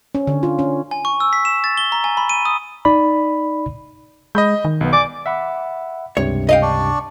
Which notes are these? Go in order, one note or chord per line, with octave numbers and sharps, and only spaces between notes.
C#4
D3
F4
C#4
G#5
C#6
E6
B6
E7
A6
G7
A#5
G#5
B5
D#7
D#6
D#4 D5 B5
G#3 D#5 B5 G6
D#3
B1 B3
D5 G#5 D6 A6
E5 F#5 B5
C#2 G2 C3 C#5
D#5 F5 G5
D4 D5 C#6